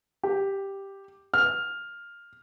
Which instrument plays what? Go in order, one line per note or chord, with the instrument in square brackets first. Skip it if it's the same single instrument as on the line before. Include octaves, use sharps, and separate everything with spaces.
[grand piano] G4
F6